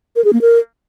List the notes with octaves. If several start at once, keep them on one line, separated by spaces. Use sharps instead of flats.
A#4
G#4
A#3
A#4